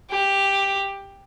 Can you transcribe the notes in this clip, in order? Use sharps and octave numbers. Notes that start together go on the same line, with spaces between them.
G4